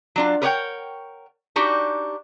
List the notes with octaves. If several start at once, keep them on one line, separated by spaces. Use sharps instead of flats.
F#3 D4 F4
A#4 B4 C#5 D5 F#5 G5
D4 D#4 F#4 G4